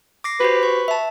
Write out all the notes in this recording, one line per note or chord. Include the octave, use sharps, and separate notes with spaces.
D6 A#6 C7
F#4 G4 B4 C5
C#6
E5 A5